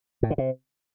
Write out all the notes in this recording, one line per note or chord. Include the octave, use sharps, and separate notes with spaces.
A2
D3
C3